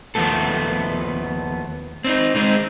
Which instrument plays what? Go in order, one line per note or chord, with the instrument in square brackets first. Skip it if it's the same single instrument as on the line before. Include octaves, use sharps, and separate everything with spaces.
[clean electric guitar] D#2 F3 A3 B3 A4
C4 D4 D#4
G#3 C4 D#4